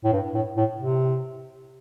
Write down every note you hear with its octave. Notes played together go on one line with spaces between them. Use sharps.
A2
G2
A2
A2
C3